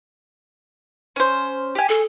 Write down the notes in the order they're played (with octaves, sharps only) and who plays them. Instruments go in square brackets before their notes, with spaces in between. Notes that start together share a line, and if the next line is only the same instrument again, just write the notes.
[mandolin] C#4 C5
G4 G#5
[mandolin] G#4 [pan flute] A4